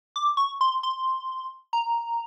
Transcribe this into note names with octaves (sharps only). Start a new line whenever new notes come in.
D6
C#6
C6
C6
A#5